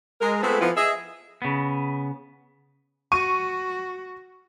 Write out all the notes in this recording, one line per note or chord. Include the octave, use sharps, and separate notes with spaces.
G#3 A#4
G#3 A3 B3 C4 F4 A4
E3 F3 B3
G#4 D#5 E5
C#3 B3
F#4 C#6 D#7